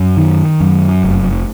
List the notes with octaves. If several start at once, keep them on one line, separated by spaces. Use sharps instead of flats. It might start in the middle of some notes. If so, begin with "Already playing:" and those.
Already playing: F#2
D#3
F#2
F1